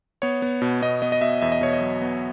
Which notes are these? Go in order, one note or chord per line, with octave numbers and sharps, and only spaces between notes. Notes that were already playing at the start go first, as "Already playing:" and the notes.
B3 C#5
B3
B2
B2 D#5
B3 D#5
D#5
B2 E5
E2 E5
D#5
B2 C#5
D#5
F#3
B3